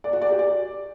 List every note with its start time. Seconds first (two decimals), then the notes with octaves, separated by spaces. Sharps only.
0.04 D5
0.13 F#4
0.22 D5
0.30 G4
0.39 D5